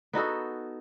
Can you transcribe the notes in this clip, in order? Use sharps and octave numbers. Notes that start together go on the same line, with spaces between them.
B3 D#4 F#4 A4